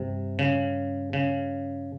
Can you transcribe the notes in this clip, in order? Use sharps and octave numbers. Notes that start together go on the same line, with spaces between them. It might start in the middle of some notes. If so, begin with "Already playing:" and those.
Already playing: G2 C3 G3
C#3
C#3